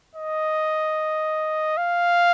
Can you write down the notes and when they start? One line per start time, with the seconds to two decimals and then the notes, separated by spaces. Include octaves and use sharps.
0.15 D#5
1.77 F5